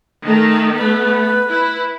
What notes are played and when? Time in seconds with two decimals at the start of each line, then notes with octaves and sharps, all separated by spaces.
0.24 D#3 A3
0.75 A3 B3 B4
1.48 E4